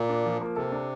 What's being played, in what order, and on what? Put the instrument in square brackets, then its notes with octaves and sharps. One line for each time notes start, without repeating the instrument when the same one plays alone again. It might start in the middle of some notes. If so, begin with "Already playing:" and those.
Already playing: [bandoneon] A#2
[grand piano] D4
F3
A#3
[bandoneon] C3 [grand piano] A4
[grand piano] D4